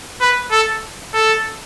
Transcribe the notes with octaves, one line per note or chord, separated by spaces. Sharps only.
B4
A4
A4